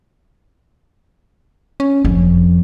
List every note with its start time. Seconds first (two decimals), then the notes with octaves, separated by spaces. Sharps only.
1.80 C#4
2.05 F#1 F2